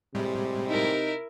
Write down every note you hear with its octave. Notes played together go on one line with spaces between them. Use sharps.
A2 C3 G3 G#3
D#4 E4 A#4